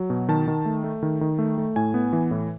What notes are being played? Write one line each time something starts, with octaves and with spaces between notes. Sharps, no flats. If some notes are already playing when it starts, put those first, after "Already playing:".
Already playing: F#3
B2
D#3 A5
D#3
A3
A3
D#3
D#3
A3
A3
A2 G#5
B3
E3
A2